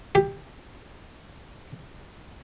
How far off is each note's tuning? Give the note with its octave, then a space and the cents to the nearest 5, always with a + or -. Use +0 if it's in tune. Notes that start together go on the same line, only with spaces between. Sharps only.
G4 +15